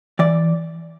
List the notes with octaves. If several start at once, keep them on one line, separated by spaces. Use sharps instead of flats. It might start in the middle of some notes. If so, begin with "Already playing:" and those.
E3 D5